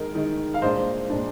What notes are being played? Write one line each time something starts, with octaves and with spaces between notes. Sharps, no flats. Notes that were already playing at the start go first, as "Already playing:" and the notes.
Already playing: D#3 G#3 D#4 A#4
D#3 G#3 D#4
F5
A#2 G#3 D4 C5 D#5
A#2 G#3 D4